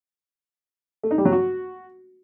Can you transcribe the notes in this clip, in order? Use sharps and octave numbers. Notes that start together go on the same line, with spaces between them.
A3
D#4
G3
F#3
F#4